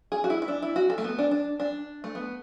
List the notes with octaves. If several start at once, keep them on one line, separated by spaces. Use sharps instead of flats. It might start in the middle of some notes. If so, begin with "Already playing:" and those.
G#4
F#4
E4
E4
D4
E4
F#4
A4
A3
B3
D4
D4
D4
A3
B3